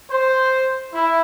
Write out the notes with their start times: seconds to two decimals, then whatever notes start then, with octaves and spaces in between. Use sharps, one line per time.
0.10 C5
0.93 E4